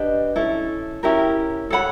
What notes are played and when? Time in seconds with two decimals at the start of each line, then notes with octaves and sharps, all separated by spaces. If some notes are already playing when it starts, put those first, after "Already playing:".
Already playing: D4 G4 B4 D#5
0.36 C#4 E4 A4
1.03 C#4 E4 G4 A#4
1.70 A4 C#5 F#5 B5